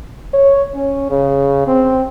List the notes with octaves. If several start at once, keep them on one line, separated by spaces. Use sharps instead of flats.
C#5
C#4
C#3
C4